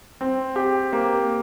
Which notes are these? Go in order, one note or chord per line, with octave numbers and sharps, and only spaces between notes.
C4
G4
A#3